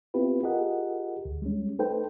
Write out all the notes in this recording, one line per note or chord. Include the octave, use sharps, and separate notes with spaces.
B3 C4 E4 F4 G4 B4
F4 G4 G#4 A#4 D#5 F#5
D2
G3 G#3 C#4
A3 D#4 A4 B4 C5 G5